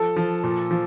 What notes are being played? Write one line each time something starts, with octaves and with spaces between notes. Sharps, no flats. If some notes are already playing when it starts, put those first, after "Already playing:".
Already playing: F3 A4
F3
A#2
F3